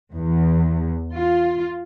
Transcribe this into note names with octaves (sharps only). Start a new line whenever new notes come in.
E2
F4